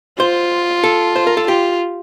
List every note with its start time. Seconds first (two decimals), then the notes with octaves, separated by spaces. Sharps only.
0.19 F4 C5
0.84 A4
1.16 C5
1.27 A#4
1.37 A4
1.48 F4 G4